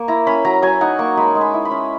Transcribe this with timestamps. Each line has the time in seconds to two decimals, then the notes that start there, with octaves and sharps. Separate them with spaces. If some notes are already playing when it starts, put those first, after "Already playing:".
Already playing: A#3 C#6
0.08 E4 A#5
0.27 C#4 B5
0.45 F#3 A#5
0.62 F#3 G#5
0.81 D#4 F#5
0.99 A#3 C#6
1.17 G#3 B5
1.35 G#3
1.41 B5
1.54 E4
1.65 B5
1.71 C#4